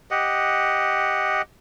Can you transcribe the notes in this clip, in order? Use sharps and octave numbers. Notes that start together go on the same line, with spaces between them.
G4 D#5 F#5